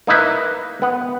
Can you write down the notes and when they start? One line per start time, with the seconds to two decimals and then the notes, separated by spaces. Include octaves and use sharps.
0.07 A#3 D#4 E4 B4
0.82 B3 F#5